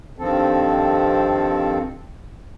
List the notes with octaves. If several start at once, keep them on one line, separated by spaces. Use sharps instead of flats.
G2 D#3 F3 C4 A4